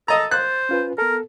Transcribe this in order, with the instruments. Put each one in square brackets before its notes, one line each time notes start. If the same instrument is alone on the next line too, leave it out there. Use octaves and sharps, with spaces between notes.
[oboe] A4 [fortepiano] D#5 A#5
[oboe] C5 [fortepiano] F#6 [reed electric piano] A6
[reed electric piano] C#4 F4 B4
[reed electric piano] B3 A4 [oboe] A#4